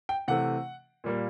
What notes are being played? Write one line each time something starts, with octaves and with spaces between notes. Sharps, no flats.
G5
C3 E3 A3 F#5
A#2 G3 A#3